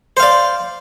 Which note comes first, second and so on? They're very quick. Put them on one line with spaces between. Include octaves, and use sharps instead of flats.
C5 F5 D5